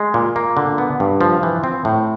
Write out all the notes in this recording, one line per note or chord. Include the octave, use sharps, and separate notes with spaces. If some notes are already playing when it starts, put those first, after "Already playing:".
Already playing: G#3
A#2
A#3
D3
B3
G2
F3
E3
C4
A2